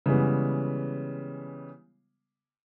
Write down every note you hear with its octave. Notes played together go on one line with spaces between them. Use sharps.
C#3 E3 G3 G#3 B3